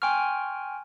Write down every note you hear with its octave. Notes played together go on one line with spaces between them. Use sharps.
G5 G#5 C6 C#6 F6